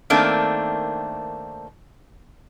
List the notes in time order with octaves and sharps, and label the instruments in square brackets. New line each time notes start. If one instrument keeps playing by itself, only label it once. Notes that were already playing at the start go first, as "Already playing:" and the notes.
[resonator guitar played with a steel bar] D#3 A3 A#3 C4 D4